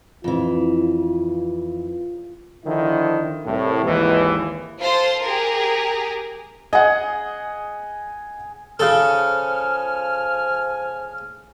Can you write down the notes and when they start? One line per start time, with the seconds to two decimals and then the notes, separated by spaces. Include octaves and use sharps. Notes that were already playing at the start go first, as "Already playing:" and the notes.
0.24 F2 E3 F4
2.66 D3 D#3 F3 E4
3.45 C2 A2
3.84 G#1 D#2 E3
4.79 F4 A4 C5 C6
5.22 G4 G#4 A#4
6.73 G#4 D#5 F#5
8.80 C#3 F3 A4 G#5 F6